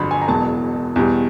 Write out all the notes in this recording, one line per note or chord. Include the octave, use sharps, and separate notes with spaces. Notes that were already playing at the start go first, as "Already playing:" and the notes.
Already playing: G1 F2 D3 F#3 B5 C6
G#5
A#5
E1 E2 B2 F#3 A5
E2 B2 G3